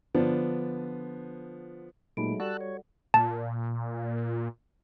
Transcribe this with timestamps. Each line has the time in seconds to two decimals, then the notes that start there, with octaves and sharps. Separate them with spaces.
0.15 D3 F3 B3 D4
2.17 A#2 F#3 G#3 A3 D#4 B5 D7
2.40 G3 F#4 A4 D5 F#5 A5 E6 F#6
2.61 C#5
3.14 A#2 A5